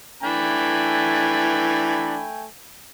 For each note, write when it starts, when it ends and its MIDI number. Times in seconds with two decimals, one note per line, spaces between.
0.23 2.25 52
0.23 2.47 57
0.23 2.25 62
0.23 2.47 79
0.23 2.47 80
0.23 2.25 83